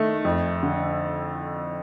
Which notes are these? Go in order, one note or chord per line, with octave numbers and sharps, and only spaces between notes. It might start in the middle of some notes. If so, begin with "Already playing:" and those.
Already playing: D#3 A3
F2
D3